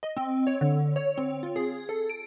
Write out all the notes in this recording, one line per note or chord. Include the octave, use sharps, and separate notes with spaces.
D#5
C4
C#5
D3
C#5
C4
F4
G#4
A4
D7